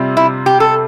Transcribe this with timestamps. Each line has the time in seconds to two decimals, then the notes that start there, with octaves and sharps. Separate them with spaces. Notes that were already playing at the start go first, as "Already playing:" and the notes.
Already playing: C3 G3 C4 F4
0.17 E4
0.46 G4
0.60 A4